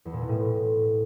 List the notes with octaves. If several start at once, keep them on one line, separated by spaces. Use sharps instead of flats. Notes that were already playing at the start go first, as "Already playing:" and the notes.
E2
A#2
B2
A2